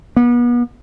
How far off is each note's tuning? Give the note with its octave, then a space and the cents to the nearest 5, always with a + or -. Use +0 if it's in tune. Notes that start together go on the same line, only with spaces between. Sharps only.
B3 -35